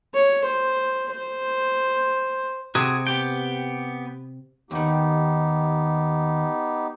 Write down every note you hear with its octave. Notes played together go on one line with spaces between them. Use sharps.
C#5
C5
C5
C3 F#4 G#4
B3 G4 G5
D#2 D#3 B3 D#4 G4